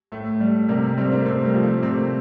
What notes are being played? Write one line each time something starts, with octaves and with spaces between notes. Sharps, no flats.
A2 A3
G3
C3 G3 A#3
G3 A3 C4
A#3 D4
C3 A3 C4
G3 A#3
F3
A3
C3 A3 C4